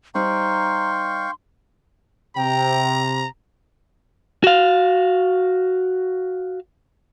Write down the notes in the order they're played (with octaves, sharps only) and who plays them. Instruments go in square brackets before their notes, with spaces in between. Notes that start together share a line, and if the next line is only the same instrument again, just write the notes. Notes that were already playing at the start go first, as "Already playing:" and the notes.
[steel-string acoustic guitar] G3 D#4 C5 [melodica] F5 G5 C#6 [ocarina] A#5 [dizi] C6
[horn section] C3 [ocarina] G5 [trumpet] A#5
[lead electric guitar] F#4 F5